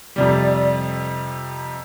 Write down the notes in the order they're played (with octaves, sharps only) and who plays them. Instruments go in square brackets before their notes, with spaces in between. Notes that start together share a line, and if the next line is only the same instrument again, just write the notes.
[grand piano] F2 C3 G3 [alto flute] D5